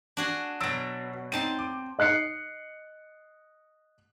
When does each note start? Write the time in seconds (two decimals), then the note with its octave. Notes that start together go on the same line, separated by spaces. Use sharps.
0.17 D4 F#4 G#4
0.61 B2 F#3 E6 A6 D7
1.32 C4 D#4 A5 C6 D#7
1.59 D6
1.99 D#5 F#6 C7 C#7